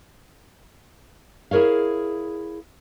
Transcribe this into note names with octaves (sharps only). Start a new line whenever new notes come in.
E4 G#4 A#4 C#5 F5